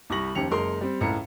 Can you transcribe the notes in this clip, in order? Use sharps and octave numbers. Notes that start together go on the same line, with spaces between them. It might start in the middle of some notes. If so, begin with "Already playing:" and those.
C2 G3 C#6 A#6 F#7
F1 D#2 C#4 G4 C#7 F7
F#1 G#3 A#4 C6
G3 C4
C#2 A2 A#5 C#7